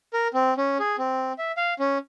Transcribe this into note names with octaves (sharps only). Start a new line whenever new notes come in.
A#4
C4
C#4
G#4
C4
E5
F5
C#4